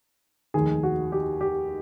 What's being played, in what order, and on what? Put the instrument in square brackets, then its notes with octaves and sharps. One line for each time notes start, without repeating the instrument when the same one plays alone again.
[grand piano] F1 D#2 D#3 G#4
F#4
G4
G4